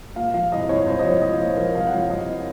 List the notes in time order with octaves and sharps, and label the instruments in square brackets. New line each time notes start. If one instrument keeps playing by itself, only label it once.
[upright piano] A#2 F5
F3 F5
C2 D#5
C2 C#5
C2 C5
D#5
F3 C#5
F3 D#5
A#2 C5
F3 A#4
C2 F5
F#5
F3 F5
C2 D#5